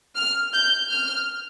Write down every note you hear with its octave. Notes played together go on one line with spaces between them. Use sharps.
F6
G6
F6